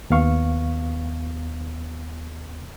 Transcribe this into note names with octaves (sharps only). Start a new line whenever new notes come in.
D#2 B3 F5 C#6